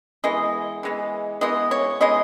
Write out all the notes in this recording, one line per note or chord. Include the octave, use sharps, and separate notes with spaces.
E3 G#3 B3 D#5
E3 G#3 B3
E3 G#3 B3 D#5
C#5
E3 G#3 B3 D#5